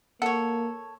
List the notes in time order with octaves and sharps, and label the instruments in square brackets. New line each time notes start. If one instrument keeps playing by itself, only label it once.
[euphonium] A#3 [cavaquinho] A4 C#5 [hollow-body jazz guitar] F#5